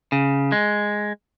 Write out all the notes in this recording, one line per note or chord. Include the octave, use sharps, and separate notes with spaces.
C#3
G#3